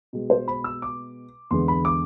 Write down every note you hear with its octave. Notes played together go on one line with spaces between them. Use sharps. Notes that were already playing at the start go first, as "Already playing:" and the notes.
B2 G#3
C5
B5
E6
D6
E2 D3 G#3 C6
B5
D6